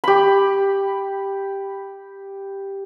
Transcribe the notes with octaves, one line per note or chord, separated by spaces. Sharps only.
G4 B5